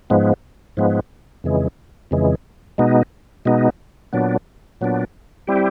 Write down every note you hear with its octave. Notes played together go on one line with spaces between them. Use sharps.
G#2 F3 G#3 B3
G#2 F3 G#3 B3
F2 C#3 E3 G#3
F2 C#3 E3 G#3
B2 G#3 B3 D#4
B2 G#3 B3 D#4
A#2 F#3 B3 D4
A#2 F#3 B3 D4
G3 C4 E4 G4